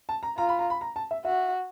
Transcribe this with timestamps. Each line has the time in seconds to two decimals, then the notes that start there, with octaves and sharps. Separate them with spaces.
0.09 A5
0.23 A#5
0.37 F4 A#5
0.49 B5
0.59 A#5
0.70 B5
0.81 A#5
0.96 A5
1.11 E5
1.25 F#4 E5